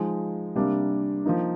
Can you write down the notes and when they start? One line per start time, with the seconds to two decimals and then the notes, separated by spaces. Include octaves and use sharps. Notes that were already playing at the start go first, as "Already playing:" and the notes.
Already playing: F3 G#3 D#4
0.56 C3 G3 A#3 D4
1.25 F3 A#3 D#4